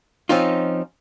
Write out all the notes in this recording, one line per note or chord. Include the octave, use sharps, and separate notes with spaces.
F3 C4 C#4 D#4 F4